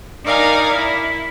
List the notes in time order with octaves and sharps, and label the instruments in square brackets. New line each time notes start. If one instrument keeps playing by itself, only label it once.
[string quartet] D#4 A#4 D5 F5 G#5 A#5
E4